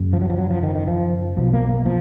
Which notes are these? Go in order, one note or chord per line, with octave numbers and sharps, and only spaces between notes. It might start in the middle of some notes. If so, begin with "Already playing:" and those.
Already playing: F#1 F#2 C#3
F3
F#3
F3
F#3
F3
D#3
D#3
F3
B1 B2 F3
A#3
A#3
F3